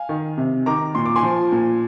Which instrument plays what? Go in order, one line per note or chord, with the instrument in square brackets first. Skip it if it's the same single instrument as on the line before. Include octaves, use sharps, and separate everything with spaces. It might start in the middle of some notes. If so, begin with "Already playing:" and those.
Already playing: [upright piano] F5 G#5
D#3
C3
D#3 A#5 D6
A#2 C6
D6
G#5 C6
F3
A#2